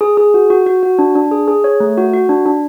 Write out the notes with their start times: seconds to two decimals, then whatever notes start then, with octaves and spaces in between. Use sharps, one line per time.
0.01 G#4
0.17 G#4
0.34 F#4
0.50 F#4
0.66 F#4
0.83 F#4
0.99 D4
1.15 D4
1.31 G#4
1.48 G#4
1.64 C#5
1.80 A3
1.98 F#4
2.13 F#4
2.29 D4
2.46 D4